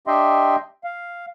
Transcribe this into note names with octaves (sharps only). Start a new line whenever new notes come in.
D4 G4 D#5 E5 G5 C6
F5